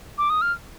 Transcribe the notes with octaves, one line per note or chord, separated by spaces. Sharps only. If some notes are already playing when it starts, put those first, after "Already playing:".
D6
D#6
F6